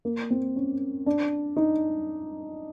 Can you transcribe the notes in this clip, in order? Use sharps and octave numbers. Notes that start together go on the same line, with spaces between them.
A#3
C4
C#4
D4
D#4